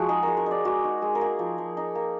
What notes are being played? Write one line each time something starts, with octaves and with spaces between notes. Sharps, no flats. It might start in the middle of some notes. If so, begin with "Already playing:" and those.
Already playing: F3 G#3 F#4
D#4 G#4
G#3 A#4
A#4
D#4 D5
G#3 F#4
D#4
G#3
A#4
A#3 G#4
F3
F3
D#4
A#3